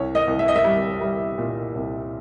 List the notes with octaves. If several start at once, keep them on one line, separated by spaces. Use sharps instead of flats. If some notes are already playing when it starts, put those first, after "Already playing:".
Already playing: C2 C#5
D#5
C2
E5
D#5
E5
G3
G3
A#2
C2